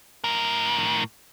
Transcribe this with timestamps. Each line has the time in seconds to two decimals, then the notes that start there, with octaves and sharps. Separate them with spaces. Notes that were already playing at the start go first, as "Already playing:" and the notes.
0.24 A2 A#4